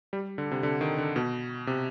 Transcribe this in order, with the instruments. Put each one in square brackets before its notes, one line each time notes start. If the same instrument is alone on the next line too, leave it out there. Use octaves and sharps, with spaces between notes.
[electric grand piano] G3
D3
C3
D3
D#3
D3
B2
C3